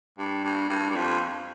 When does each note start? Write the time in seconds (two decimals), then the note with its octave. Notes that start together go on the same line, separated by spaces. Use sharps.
0.18 G2
0.44 G2
0.69 G2
0.90 G2
0.95 F2